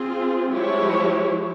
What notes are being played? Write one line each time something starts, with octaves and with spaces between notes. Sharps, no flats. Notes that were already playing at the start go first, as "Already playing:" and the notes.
Already playing: C4 F4 G#4
F3 G#3 E4 G4 C#5